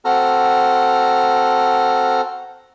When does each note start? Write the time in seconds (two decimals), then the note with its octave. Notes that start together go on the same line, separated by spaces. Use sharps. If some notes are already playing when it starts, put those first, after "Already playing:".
0.05 C4 F#4 A4 A#5 F6